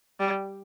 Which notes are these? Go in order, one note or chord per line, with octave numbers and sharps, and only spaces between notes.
G3